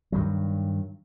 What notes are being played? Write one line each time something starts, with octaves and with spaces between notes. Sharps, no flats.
G2 D#3 F#3